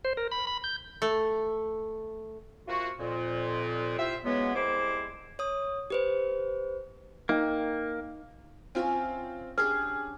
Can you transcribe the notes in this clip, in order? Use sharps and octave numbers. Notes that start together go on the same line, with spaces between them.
C5
A#4
B5
B5
G6
A3
C3 A#3 F4 F#4
F2 A#2
E4 F4 G4 C5 E5
C#3 E3 F#3 G#3 B3
C2 C3 G#3 E4 C5 D6
C#5 D#6
G4 B4 C5
A#3 D#4 G5
C4 C#4 F4 E5 G#5
C#4 D4 G4 G#4 F6